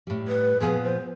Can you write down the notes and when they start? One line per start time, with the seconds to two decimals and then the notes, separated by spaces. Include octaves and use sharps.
0.07 A2 G3
0.28 B4
0.60 A#2 F3 B3 G#4
0.83 C5